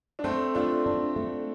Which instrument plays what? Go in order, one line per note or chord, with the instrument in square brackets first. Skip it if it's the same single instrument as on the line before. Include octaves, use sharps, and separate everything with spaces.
[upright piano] D4
[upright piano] A3 C4 [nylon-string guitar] A4
[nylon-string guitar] A3 [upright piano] D4 F4
[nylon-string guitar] D4
A3